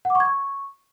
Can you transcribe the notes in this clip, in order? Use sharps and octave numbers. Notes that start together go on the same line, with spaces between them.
F#5
D6
C#6
G#6
C#6